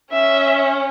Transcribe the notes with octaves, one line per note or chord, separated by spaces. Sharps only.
C#4 E5